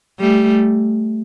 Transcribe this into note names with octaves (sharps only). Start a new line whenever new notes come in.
G3 A3